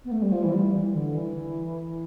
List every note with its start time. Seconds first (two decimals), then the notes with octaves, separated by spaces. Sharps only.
0.05 B3
0.11 A3
0.22 G3
0.32 F3
0.43 E3
0.53 G3
0.74 E3
0.94 D3
1.14 E3